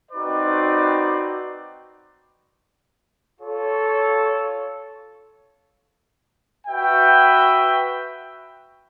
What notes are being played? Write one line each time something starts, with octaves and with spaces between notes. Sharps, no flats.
C4 D#4 F#4 B4 D5
F4 A4 C#5
F#4 B4 E5 G5